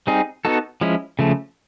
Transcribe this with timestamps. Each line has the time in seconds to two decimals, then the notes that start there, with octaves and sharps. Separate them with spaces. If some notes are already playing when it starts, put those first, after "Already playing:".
0.07 G3 C4 D#4 G#4
0.45 B3 D#4 F#4 A4
0.81 F3 G#3 C#4 E4
1.19 C#3 F3 A3